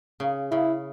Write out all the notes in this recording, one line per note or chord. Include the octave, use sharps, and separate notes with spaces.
C#3
C#3 E4